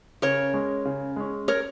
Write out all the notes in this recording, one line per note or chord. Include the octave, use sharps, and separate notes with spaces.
C#3 A#4 C#5
G#3 C#4
C#3
G#3 C#4
A#4 C#5